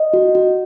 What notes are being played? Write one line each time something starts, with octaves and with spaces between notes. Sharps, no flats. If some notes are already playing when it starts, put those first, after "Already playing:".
Already playing: D#5
F#4
F#4